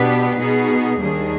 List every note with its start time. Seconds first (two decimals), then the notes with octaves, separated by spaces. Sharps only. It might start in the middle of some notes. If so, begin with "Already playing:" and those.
Already playing: B2 B3 D4 G4 B4
0.38 B2 B3 D#4 G#4
1.00 D#2 D#3 G3 D4 G#4